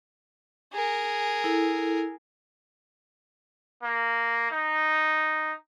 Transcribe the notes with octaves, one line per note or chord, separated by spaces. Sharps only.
G#4 A#4
E4 A4
A#3
D#4